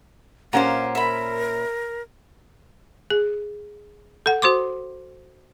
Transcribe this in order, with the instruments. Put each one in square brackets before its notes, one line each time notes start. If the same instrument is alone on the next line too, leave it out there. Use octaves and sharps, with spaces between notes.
[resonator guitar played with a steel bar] A#2 C#4 C5 [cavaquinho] G4 A#4 F#5 [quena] F5
[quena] A#4 [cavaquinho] E5 B5
[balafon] G#4
A4 F#5
F#4 C5 C6 D6